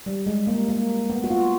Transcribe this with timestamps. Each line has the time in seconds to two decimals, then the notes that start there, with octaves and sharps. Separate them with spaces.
0.06 G3
0.26 G#3
0.47 A#3
0.68 A#3
1.10 B3
1.24 F#4
1.30 F4